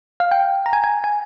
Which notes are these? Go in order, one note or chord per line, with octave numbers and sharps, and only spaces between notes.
F5
G5
A#5
G#5
G#5
G#5